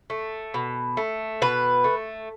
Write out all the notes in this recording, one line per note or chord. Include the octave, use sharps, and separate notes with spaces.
A3
B2
A3
B2 B4
A3